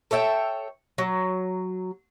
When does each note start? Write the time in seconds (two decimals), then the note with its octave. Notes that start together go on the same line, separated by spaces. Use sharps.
0.11 A4 C#5 E5 G5
0.98 F#3